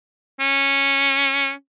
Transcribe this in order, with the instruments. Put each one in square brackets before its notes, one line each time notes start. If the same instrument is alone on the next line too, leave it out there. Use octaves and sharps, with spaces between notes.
[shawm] C#4